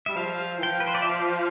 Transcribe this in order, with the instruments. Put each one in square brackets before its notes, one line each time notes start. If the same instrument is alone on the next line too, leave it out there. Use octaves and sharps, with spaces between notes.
[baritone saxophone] G3 [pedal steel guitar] E5
[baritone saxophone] F3 [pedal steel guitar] F5
[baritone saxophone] E3
[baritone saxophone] F3 [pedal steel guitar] G5
[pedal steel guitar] B4
C5
D5
E5
F5